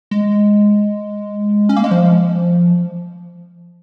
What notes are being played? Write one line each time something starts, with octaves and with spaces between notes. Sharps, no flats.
G#3
C#4
A#3
G#3
F3